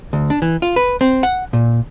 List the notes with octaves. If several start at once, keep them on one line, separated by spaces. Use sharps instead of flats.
D2
D4
E3
F4
B4
C4
F#5
A#2